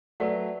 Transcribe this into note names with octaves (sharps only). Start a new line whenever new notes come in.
F#3 A3 B4 D5 F#5